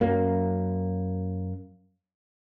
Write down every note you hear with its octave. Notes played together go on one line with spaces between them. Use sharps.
F#2 F#3 A#3